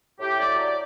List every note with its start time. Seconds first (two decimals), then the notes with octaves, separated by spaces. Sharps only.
0.19 A2 G4
0.39 D5
0.45 F#3
0.58 D5